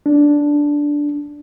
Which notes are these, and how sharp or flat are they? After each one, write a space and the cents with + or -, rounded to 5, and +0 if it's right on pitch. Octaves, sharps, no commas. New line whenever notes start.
D4 -5